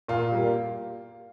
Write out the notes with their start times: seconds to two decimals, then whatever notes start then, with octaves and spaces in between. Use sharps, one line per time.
0.08 A#2 F4
0.32 G3 A#3